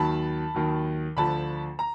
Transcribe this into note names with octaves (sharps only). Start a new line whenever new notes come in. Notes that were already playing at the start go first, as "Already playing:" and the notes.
Already playing: D#2 D#3 F#3 A5 B5
D#2 D#3 F#3
D2 D3 F3 A5 B5
A#5